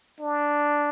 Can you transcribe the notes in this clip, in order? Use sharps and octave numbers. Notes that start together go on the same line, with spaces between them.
D4